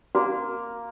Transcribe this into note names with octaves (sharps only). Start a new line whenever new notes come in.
A#3 F#4